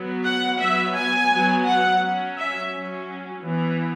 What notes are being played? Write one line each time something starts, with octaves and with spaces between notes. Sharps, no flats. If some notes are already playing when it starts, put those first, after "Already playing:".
Already playing: F#3 B3
F#5
F#3 B3 E5
G#5
F#3 B3
F#5
F#3 C#4
E5
F#3 C#4
E3 B3